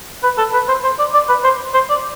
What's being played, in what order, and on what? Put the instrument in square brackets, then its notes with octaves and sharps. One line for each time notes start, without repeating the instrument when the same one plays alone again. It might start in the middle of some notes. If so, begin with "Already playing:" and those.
[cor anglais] B4
A4
B4
C5
C5
D5
D5
B4
C5
C5
D5